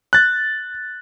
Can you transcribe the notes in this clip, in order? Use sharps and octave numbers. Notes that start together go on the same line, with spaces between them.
F#6 A6